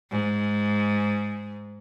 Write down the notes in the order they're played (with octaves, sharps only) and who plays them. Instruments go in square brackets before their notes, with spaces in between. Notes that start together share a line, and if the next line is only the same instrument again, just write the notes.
[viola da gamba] G#2